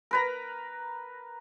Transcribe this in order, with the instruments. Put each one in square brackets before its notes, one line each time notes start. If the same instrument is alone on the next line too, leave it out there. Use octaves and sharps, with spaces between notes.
[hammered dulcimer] A#4 B4 A#5